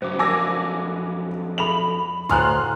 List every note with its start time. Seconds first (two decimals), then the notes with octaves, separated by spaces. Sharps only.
0.02 G2 C#3 F#3 C5 D6
0.19 F2 F#3 D4 A#4 G#5 D6 E6 A#6
1.58 G#4 A4 E5 B5 F7 F#7
2.29 D2 A2 E4 G#5 A#5 C6 F6 F#6